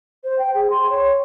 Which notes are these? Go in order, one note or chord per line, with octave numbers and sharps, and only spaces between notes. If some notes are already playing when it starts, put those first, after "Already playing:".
C5
G5
G#4
C6
C#5